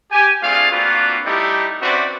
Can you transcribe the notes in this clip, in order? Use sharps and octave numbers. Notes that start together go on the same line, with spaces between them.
G4 G#5
A3 C4 D4 F4 G#4 F5
A#3 C4 D4 F4 F#4 B4
G3 A3 D#4 E4 G4
C4 C#4 F#4 B4 D5 E5